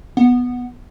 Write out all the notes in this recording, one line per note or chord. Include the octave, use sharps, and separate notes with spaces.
B3